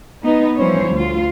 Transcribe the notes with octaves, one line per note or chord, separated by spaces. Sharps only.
B3 D#4
E3 F3 G3 C#4 C5 C#5
D2 F4